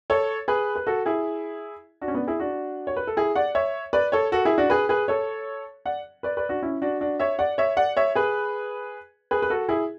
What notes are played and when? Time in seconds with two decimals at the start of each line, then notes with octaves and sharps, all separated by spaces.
0.10 A4 C#5
0.48 G#4 B4
0.76 B4
0.87 F#4 A4
1.06 E4 G#4
2.01 D4 F#4
2.08 C#4
2.15 B3 D4
2.27 E4 G#4
2.40 D4 F#4
2.87 C#5
2.96 B4
3.07 A4
3.17 E4 G#4
3.35 D5 F#5
3.55 C#5 E5
3.93 B4 D5
4.12 A4 C#5
4.32 F#4 A4
4.45 E4 G#4
4.58 D4 F#4
4.70 G#4 B4
4.89 G#4 B4
5.08 A4 C#5
5.85 D5 F#5
6.23 B4 D5
6.37 B4 D5
6.49 D4 F#4
6.62 C#4 E4
6.82 D4 F#4
7.00 D4 F#4
7.20 C#5 E5
7.39 D5 F#5
7.58 C#5 E5
7.77 D5 F#5
7.97 C#5 E5
8.15 G#4 B4
9.31 G#4 B4
9.42 B4
9.50 F#4 A4
9.69 E4 G#4